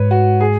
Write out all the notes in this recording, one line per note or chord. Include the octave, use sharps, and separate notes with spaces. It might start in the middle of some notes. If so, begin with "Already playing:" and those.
Already playing: G#2 B4 C#5
F#4
G#4